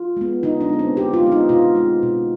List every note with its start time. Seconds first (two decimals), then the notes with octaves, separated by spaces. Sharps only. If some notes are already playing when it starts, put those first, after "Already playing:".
Already playing: F4
0.17 G#3 B3
0.43 D3 D#4
0.61 D4
0.69 G#3 B3
0.79 C4
0.97 D3 G4
1.13 F4
1.23 G#3 B3
1.32 D#4
1.49 B2 F4
1.75 G#3 C4
2.03 B2